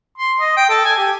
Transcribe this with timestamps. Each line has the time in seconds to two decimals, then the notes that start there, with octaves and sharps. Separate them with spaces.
0.18 C6
0.40 D#5
0.57 G5
0.69 A4
0.85 G#5
0.97 G4